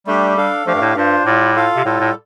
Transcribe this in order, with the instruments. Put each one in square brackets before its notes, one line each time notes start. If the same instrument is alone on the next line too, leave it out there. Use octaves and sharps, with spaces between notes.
[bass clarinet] G3 [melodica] A3 D4 G4
[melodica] D4 A4 F5
[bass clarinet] F3 [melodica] A3 D4 G4 F5
[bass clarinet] G2
A2
[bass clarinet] G2 [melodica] D4 F4 C5
[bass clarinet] A2 [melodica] G3 F4 D5
[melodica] F4 A4 F5
[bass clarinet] C3
[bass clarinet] A2 [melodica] G3 F4 A4
[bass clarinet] A2